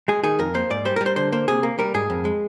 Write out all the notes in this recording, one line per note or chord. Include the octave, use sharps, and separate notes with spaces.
G#3 G#4
D#3 G#4
F2 A#4
A#3 C5
G#2 D5
G3 C5
A#4
G3
C5
D3 C5
A#3 C5
C3 G#4
A#3
G3 A#4
G#2 G#4
F2
G#3